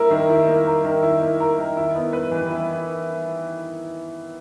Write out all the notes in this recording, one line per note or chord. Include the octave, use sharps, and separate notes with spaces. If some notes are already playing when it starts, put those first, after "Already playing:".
Already playing: A#3 E4 A#4
D#3
E4
A#3
A#4
D#3
E4
A#3
A#4
D#3
E4
B3
B4
E3
E4